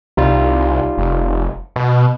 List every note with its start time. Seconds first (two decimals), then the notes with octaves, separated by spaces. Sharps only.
0.17 C2 G3 D#4 F4
0.97 F1
1.76 B2